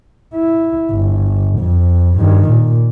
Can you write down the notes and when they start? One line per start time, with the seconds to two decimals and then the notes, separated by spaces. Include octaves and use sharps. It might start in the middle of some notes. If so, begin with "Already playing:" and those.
0.35 E4
0.91 G1
1.60 F2
2.18 G2 D#3
2.49 A#2